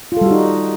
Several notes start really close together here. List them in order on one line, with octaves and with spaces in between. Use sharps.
F4 A4 G3 F#4 D#4